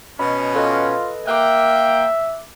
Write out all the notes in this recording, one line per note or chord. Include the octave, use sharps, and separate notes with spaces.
B2 C#4 D#5 B5
F4 A4 B4 D#5
A#3 E5 G5 D6 F#6